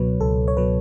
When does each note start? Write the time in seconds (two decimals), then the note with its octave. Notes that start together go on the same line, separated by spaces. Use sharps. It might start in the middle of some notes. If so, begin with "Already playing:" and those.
Already playing: C#2 B2 F#3 B4 C#5
0.21 C#2 A4
0.48 C#5
0.57 B2 F#3 B4